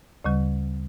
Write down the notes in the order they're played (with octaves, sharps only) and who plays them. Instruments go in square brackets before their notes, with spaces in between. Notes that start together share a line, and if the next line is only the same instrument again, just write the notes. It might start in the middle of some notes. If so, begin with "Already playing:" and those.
[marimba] D2 C#3 G3